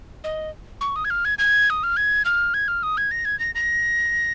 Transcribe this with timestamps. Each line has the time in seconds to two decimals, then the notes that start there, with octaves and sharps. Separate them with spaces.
0.24 D#5
0.81 C#6
0.96 D#6
1.05 G#6
1.10 F6
1.25 G#6
1.38 G#6
1.70 D#6
1.83 F6
1.97 G#6
2.25 F6
2.54 G#6
2.68 F6
2.83 D#6
2.97 G#6
3.11 A#6
3.25 G#6
3.39 A#6
3.55 A#6